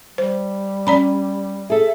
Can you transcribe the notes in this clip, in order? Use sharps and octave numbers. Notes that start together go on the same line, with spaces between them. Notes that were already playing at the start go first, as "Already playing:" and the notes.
G3 C5
C#4 D5 A#5 B5
G#4 A4 E5